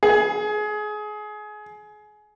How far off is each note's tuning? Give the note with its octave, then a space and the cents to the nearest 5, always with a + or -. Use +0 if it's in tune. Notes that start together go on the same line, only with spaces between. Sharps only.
G#4 +25